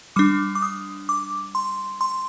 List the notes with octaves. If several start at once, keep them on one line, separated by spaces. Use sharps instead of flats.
G3 D4 D6
D6
D#6
D6
C6
C6